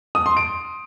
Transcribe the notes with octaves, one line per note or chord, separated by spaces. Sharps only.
D#6
C6
D7